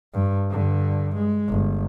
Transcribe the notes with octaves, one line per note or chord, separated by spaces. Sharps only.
G2
G2 D3
G#3
G1